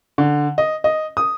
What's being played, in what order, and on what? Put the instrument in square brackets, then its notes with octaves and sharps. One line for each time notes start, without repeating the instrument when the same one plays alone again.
[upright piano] D3
D#5
D#5
D#6